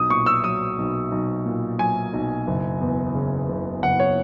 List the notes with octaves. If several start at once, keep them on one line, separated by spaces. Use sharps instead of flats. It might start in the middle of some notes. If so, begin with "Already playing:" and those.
Already playing: B1 D#6
A#2 C#6
E6
F#3 D#6
B1
B1
A#2
F#3 G#5
B1
F#1
E2
C#3
F#1
F#1 F#5
C#5